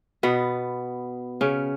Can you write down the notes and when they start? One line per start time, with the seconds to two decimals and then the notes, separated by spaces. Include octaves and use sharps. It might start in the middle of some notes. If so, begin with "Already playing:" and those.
0.23 B2 B3
1.41 C#3 C#4